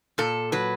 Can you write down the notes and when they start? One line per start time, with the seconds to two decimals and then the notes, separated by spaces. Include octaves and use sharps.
0.18 A#2 A4
0.52 F#3 B4